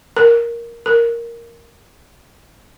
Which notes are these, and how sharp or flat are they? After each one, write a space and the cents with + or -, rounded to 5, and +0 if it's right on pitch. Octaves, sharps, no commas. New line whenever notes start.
A#4 +5
A#4 +0